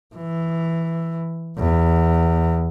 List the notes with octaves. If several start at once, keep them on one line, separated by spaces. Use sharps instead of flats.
E3
E2